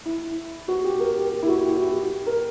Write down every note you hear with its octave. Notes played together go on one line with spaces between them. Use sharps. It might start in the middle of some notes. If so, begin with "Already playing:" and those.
E4
F#4
G4
A#4
G4
G4
E4
F#4
G4
F#4
G4
A#4